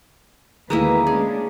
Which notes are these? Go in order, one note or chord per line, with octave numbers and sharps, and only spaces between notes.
D2 D#3 G#3 A#3 E4 B4 A#5
G#3 C#4 D4 G#4